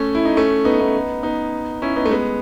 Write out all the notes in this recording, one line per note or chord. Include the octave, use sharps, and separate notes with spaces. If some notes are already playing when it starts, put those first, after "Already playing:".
Already playing: A3 C#4
E4
D#4
A3 C#4
B3 D#4
B3 D#4
B3 D#4
C#4 E4
B3 D#4
A3
G#3 B3